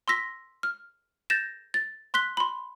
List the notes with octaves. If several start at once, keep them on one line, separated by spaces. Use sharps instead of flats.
C6 E6 A#6 B6
F6
G6 A6 A#6 E7
A6
C6 F#6 B6 G7
B5 C6